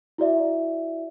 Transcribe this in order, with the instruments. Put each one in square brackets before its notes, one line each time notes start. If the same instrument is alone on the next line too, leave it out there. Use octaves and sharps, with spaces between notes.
[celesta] E4 F#4 D5 E5